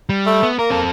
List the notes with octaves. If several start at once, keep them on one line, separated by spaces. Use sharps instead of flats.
G3
A3
B3
A#3 A#4
C4 A4